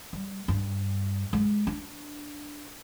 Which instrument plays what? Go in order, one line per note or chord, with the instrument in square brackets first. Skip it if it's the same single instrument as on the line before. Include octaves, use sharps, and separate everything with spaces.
[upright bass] G3
G2
G#3
D4